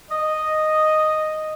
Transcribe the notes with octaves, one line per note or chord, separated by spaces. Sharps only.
D#5